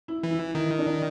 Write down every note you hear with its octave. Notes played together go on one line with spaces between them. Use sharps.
E4
E3
E4
D#3 E4
D4